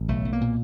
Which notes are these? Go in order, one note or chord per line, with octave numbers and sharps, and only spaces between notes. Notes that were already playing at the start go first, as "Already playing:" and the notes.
Already playing: A1
B1 A3
B1
A#3
A#2